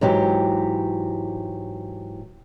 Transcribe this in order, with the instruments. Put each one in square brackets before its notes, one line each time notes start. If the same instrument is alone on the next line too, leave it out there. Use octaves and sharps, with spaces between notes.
[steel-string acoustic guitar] G#2 E3 F#3 G4